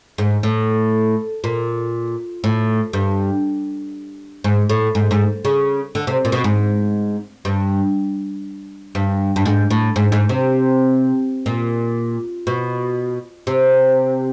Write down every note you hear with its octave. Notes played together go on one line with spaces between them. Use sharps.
G#2
A2
A#2
A2
G2
G#2
A2
G#2
G#2
C#3
D3
C3
A#2
B2
G#2
G2
G2
G2
G#2
A2
G#2
G#2
C3
A#2
B2
C3